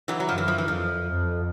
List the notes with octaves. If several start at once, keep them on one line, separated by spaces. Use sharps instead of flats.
E3 F#3
F#3
F#2 F3
E3
F3
E3
F2 F3
F2